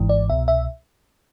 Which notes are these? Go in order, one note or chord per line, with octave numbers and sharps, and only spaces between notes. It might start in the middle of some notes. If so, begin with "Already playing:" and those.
Already playing: G#1 G#2 E3
D5
C2 B2 E5
E5